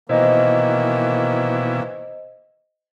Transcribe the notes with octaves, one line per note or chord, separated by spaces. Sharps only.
B2 D#3 E3 A#3 E4 C5 D#5